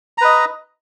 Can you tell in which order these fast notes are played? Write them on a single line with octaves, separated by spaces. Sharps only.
A#5 B4 D#5